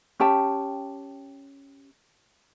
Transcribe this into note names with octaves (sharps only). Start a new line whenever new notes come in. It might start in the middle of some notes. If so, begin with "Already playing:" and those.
C#4 G4 G5 A5